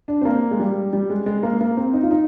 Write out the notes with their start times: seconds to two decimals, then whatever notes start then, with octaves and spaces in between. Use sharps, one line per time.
0.08 D4
0.21 C4
0.25 A#3
0.51 G#3
0.59 G3
0.93 G3
1.10 G#3
1.26 G#3
1.43 A#3
1.61 A#3
1.77 C4
1.93 D#4
2.03 F4
2.11 D#4